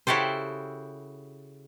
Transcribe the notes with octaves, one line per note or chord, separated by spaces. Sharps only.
C#3 E4 F#4 G4 A4 C5